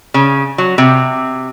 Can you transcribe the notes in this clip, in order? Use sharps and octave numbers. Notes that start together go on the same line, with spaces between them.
C#3
F#3
C3